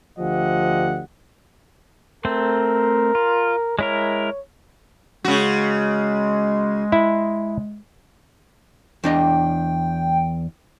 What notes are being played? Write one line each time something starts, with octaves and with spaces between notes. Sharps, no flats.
D2 F3 G4 D#5 F#5
A3 C4 A#4 C5
F4
G#3 E4 A#4 C#5
C#3 G#3 F#4
E4
E2 D4 D#5 G5